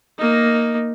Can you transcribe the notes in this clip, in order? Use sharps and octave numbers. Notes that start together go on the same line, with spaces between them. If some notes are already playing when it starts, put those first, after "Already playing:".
A#3 D#4